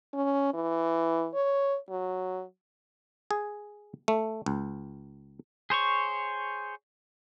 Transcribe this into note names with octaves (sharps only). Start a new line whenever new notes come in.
C#4
E3
C#5
F#3
G#4
A3
C#2
G#4 C5 C#5 C#6